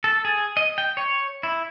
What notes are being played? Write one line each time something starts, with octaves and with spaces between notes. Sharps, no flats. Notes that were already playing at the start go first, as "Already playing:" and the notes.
A4
G#4
D#5
G5
C#5
E4